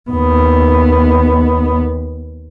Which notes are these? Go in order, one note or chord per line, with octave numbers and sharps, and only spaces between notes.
D#2 B3